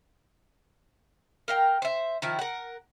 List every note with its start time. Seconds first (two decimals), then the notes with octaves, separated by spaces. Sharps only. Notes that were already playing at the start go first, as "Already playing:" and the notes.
1.48 A#4 F5 G5
1.82 C5 E5
2.22 D#3 F3 E4
2.39 A#4 F#5